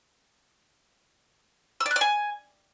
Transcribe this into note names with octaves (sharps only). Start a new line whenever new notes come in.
E6
D5
F#6
D5
G#5